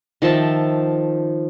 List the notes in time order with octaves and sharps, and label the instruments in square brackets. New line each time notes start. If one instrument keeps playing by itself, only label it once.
[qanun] D#3 F3 E5 A5